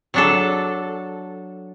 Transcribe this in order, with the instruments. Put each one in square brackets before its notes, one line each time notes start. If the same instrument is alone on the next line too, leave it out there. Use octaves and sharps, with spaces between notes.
[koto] F#3 D4 A4